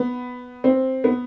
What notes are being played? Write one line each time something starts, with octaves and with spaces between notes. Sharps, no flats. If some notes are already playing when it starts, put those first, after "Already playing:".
Already playing: B3
C4
B3